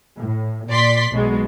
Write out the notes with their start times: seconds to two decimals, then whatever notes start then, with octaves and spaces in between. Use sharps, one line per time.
0.18 A2
0.70 A#2 D5 C6 B6
1.12 B1 B2 G#3